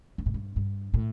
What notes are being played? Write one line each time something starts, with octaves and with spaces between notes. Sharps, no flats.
G2
A2
G2
G2
A2